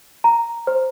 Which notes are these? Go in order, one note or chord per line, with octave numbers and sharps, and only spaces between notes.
A#5
C5